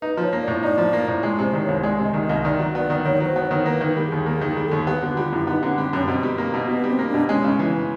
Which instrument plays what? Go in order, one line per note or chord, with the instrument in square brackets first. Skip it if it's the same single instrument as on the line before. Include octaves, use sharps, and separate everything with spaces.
[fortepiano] D#4 [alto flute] B4
[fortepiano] F3 [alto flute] C#5
[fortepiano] A#3
[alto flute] D5
[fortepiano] A2
[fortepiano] D#4 [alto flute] D5
[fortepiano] F3
A#3
A2
[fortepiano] G#3 [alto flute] D5
[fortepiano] C3
[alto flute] C5
[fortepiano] D#3
[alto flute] C#5
[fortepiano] C2
[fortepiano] G#3 [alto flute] D5
[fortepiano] C3 [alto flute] D#5
[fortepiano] D#3
[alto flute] D#5
[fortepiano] C2
[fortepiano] D#3 [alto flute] D5
[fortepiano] F#3
[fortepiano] B3 [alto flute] D5
[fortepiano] D#3
[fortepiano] D#3 [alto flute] C#5
[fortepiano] F#3
[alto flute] C5
[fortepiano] B3
[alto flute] C#5
[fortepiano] D#3
[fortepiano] A#3 [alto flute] B4
[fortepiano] D#3 [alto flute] A#4
[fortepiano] G3
[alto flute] G#4
[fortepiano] D#2
[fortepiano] A#3 [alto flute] G#4
[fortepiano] D#3
[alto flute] G#4
[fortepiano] G3
[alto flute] A4
[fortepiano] D#2
[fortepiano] B3 [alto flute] G4
[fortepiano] D3 [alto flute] F#4
[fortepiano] G3 [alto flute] F4
[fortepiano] F#2 [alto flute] E4
[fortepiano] B3 [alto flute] D#4
[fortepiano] D3 [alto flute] C#4
[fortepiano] G3 [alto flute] C4
[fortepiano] F#2 [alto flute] C#4
[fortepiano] B2 [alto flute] C4
[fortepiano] G3
A#3
B2
[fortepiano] B2 [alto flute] B3
[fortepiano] G3 [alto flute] C4
[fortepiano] A#3
[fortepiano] B2 [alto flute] D4
[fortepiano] G#3 [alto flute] C#4
[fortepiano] C#3
E3